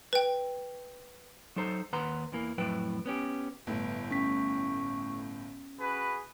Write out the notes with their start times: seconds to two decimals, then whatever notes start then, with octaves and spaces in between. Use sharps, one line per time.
0.13 B4 G5
1.56 F#3 D#4 A4 C5 A#5
1.93 D#2 B4 F#5 A#5 C6
2.32 E2 E3 A#3
2.58 F2 A2 F#3 E4 B4 G5
3.06 B3 C#4 G4
3.67 G1 A2 B4
4.11 C#4 C#6 B6
5.80 F#4 G#4 B4 B5